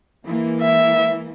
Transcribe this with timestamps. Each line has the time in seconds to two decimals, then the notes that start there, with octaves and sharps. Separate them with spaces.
0.25 E3 G#3 A#3
0.61 E5